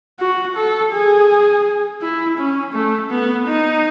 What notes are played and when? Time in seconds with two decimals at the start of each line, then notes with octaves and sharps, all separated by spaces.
0.20 F#4
0.56 A4
0.93 G#4
2.02 E4
2.38 C#4
2.73 A3
3.10 B3
3.47 D#4